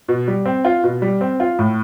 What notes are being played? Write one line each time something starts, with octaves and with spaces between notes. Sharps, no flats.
B2
G3
C4
F4
B2
G3
C4
F4
A2